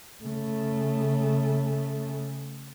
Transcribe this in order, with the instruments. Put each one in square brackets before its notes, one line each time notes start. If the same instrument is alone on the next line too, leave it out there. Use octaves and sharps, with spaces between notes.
[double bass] C#3 A3